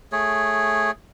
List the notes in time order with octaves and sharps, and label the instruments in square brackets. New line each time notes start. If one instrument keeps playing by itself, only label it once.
[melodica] A3 G#4 C#5